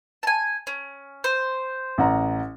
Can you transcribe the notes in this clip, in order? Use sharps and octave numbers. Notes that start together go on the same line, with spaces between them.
G#5 A5
C#4
C5
A1 F#5 A#5